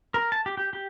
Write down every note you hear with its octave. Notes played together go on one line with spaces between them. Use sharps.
A#4
A5
G4
G4
G4